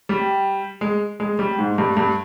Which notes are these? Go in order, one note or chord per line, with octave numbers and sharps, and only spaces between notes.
G3
G#3
G#3
G3
G#2
G2
G2